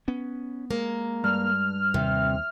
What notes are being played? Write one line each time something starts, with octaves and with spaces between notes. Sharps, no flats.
B3 C#4
G#3 A#3
G2 F6
D#2 C3